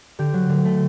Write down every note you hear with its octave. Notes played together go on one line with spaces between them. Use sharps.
D3 G4
F#3
D3
A3